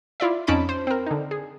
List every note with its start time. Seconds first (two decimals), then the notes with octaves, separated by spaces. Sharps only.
0.20 E4 F4 D5 E5
0.47 F2 C#4 D#4 A5 B5 D7
0.69 C5
0.87 C4 A#4
1.06 D3 D#4
1.31 G#4